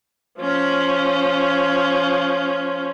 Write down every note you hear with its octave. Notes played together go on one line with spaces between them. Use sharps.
F3 C#4